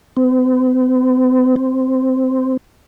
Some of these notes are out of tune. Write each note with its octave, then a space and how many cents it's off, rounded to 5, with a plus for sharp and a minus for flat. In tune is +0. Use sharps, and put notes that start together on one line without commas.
C4 -45
C4 -10